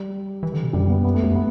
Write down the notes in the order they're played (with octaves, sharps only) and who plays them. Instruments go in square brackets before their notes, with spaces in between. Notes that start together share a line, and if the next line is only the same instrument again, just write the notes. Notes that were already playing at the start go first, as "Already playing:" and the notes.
Already playing: [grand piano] G3
[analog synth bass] E3
D3
B2
[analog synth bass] F#2 [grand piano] G3
[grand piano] B3
B3
A3
[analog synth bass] F#2
[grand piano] B3